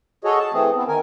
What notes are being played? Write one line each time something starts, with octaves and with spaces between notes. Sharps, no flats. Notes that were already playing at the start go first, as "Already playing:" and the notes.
F#4 G#4 A4 C#5 D#5
A5
E3 A3 C4 G#4
B3 C4
D#3 A#4 G#5